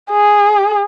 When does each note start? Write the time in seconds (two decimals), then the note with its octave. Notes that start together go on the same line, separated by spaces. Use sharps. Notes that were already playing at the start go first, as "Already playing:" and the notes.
0.11 G#4